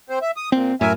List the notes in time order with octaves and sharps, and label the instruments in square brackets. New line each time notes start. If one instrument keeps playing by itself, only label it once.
[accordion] C4 C5
E5
D#6
[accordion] A#2 [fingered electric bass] C4
[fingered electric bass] F#2 A2 [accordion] A#4 E5 G#5